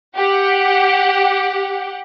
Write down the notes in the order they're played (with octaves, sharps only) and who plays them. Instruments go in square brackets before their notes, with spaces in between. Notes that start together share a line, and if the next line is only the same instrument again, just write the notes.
[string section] G4 F#5